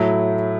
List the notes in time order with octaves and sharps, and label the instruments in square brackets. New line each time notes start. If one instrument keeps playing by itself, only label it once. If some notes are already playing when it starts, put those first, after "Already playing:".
Already playing: [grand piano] A2 F#3 A3 E4